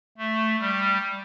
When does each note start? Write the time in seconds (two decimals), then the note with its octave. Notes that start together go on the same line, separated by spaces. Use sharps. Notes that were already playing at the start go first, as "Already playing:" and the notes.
0.18 A3
0.60 G3